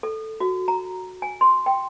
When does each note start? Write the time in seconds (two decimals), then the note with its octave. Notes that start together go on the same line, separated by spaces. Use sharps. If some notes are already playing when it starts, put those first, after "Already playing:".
0.03 A4
0.40 F#4
0.68 A#5
1.22 G#5
1.41 C6
1.66 G5